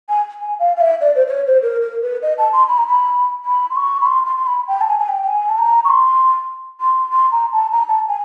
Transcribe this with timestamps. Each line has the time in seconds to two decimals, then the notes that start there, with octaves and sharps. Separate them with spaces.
0.09 G#5
0.40 G#5
0.59 F5
0.76 F5
0.81 E5
1.01 D5
1.15 C5
1.27 C5
1.31 C#5
1.47 C5
1.62 A#4
1.82 A#4
2.02 B4
2.22 D#5
2.38 A5
2.53 C6
2.68 B5
2.78 A#5
2.87 B5
3.45 B5
3.70 C6
3.76 C#6
4.01 B5
4.06 C6
4.26 C6
4.37 C6
4.47 B5
4.68 G5
4.81 A5
4.88 G#5
4.99 G#5
5.08 G5
5.23 G5
5.28 G#5
5.49 A5
5.58 A#5
5.85 C#6
5.90 C6
6.81 C6
7.12 C6
7.32 A#5
7.53 A5
7.72 A#5
7.89 A5
8.09 G#5